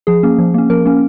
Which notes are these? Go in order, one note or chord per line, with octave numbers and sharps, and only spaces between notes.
F3 G#4
A#3 C#4
F3
A#3 C#4
F3 A#3 A#4
A#3 C#4